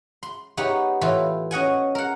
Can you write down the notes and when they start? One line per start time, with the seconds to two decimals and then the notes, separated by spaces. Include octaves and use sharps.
0.23 C6
0.57 B3 D#4 G4 C#5 F#5
1.01 A2 E3 F4
1.51 C#4 D#5 F#5 G#5
1.95 A#4 F#5